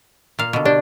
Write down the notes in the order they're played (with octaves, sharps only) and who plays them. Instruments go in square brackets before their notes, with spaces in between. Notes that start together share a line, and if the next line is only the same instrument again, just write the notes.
[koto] A#2 F5
B2 D3
[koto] D4 [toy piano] G4 D5